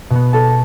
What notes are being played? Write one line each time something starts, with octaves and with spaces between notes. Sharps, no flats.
B2 B3
A4 A5